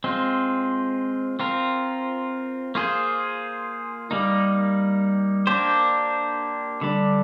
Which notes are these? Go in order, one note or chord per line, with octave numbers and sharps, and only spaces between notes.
G#3 C4 F4
C4 F4 A#4
A#3 F4 G#4 C5
G3 A#3 D#4
A#3 D4 G4 C5
D3 G3 D4